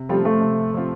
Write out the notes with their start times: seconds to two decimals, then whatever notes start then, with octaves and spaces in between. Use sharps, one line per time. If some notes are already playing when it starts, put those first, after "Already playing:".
Already playing: C3
0.09 F3 G3 A3 C4 F4
0.25 A3
0.41 C3
0.73 F3 A3 C4 F4